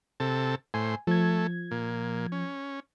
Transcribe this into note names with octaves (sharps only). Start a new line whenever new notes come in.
C3 A4
A2 C5 G#5
F3 A3 G#6
A#2
C#4